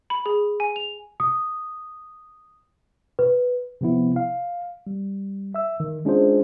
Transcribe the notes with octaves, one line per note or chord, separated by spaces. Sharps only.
B5
G#4
G#5
F7
D#6
B4
C3 F3 B3 E4
F5
G3
E5 E6
D#3
G#3 C#4 D4 F4 G#4 C5